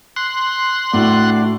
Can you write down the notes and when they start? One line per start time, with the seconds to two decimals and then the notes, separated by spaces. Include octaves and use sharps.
0.16 C6 F#6
0.94 A2 D4 F#4 D5